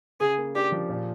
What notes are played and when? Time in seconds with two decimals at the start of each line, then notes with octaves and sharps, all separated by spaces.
0.20 C#3 G#4
0.38 A#3
0.55 D4 G4
0.72 F3
0.89 A#2